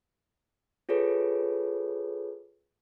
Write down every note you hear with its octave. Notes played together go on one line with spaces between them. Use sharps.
F4 G#4 A4 B4 C#5